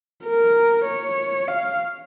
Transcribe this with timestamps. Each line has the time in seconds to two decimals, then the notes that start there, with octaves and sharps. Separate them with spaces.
0.24 A#4
0.86 C#5
1.48 F5